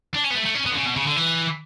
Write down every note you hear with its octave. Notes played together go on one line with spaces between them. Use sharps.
D4
C#4
B3
A3
A3
C#4
B3
D3
C#3
B2
C#3
D3
E3